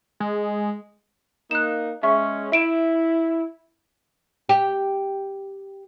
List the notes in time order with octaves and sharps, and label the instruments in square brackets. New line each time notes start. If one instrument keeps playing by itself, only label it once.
[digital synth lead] G#3
[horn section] A#3 D#4 [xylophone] F#6 E7
[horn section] G#3 C#4 [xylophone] E5 C#6
[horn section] E4 [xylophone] E5 D7 E7
[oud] G4